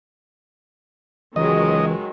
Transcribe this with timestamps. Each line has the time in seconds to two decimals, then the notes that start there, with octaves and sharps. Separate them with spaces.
1.36 C#2 D#3 E3 F#3 G#3 D#5